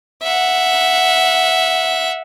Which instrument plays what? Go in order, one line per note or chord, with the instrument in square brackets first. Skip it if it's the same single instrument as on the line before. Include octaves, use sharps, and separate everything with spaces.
[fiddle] E5 F#5